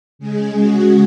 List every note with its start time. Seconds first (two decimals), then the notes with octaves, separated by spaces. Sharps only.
0.19 C#3 G#3 G#4
0.58 F#4